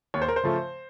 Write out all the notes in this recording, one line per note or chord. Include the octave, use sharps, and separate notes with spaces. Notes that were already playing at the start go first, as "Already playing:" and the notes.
D#2 C#5
C5
A#4
C5
C#3 F3 A3